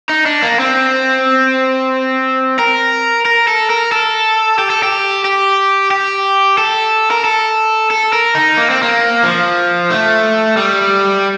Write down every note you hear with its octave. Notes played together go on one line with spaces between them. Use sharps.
D#4
D4
A#3
C4
A#4
A#4
A4
A#4
A4
G4
A4
G4
G4
G4
A4
A#4
A4
A4
A#4
D#4
A#3
C4
A#3
F3
A3
G3